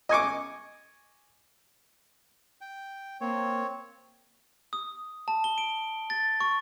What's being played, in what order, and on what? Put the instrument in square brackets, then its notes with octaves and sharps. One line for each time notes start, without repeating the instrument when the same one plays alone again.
[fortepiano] D#5 G#5 C#6 D6
[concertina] G5
[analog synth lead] A#3 [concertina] C4 C#5
[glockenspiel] D#6
A5
G7
D7
A6
C#6